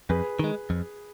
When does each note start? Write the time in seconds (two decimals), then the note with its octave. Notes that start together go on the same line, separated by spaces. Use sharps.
0.09 F2 G#4 B4
0.39 D#3 G#3
0.70 F2